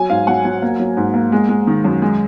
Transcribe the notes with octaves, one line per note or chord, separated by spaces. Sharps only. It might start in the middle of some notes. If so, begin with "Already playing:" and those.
Already playing: F#3 G#5
G#2 F5
F#3 F#5
F#3 G#5
A#3
F#3
G#2
A#3
G#3
G#3
D#3
F#2
G#3